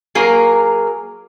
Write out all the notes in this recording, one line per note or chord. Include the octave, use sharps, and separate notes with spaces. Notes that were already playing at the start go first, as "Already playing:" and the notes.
F#3 A#3 G#4 A#4